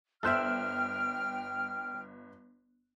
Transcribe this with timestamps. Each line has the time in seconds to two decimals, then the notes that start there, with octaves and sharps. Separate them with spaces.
0.23 G1 A4 C5 E5 G5 F6 F#6 E7